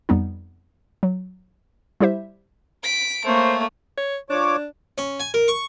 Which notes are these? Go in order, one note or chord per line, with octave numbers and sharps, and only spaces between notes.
F2 G3 B3 D#4
F#3
G3 E4 G4 C5 E5
B6 D7
A3 A#3 C5 C#5
C#5
F3 D4 C#5 D6
C#4
G#5
A#4
C#6